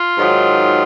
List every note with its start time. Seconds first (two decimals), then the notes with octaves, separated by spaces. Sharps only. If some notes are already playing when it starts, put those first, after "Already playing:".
Already playing: F4
0.18 G#2 D#3 F#3